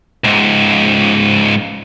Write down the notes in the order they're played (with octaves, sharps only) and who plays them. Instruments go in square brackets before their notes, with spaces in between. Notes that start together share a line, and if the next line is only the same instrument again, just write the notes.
[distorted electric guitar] C#2 G#2